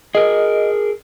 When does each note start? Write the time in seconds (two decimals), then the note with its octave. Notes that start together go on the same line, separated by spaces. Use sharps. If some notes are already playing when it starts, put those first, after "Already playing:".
0.15 G#4 A#4 D#5